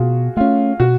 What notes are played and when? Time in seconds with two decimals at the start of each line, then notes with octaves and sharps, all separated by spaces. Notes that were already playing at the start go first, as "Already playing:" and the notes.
Already playing: B2 F4 F#4 G#4
0.37 A3 C#4 F4
0.80 B2 F#4